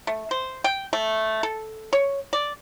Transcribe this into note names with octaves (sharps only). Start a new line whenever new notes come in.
A3
C5
G5
A3
A4
C#5
D5